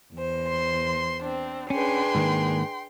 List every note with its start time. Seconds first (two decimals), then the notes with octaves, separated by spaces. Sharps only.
0.14 E2 C5
0.49 C6
1.23 C4 D4
1.70 C#4 D4 G#4 B4 G5 C6
2.15 G#2 D#3 A#3